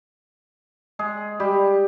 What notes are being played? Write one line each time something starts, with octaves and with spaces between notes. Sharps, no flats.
G#3 G#4
G3 G4